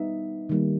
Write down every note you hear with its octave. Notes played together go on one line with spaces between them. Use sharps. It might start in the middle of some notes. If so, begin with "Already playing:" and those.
Already playing: G3 B3 D#4 E5
D#3 G3 A#3